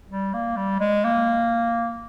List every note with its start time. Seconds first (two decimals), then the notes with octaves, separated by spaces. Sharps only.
0.10 G3
0.34 A#3
0.57 G3
0.80 G#3
1.04 A#3